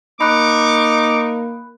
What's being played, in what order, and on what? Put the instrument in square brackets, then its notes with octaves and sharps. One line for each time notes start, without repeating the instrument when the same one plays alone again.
[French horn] A#3 [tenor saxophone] D#4 [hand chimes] B5 F#6 [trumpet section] C#6 D6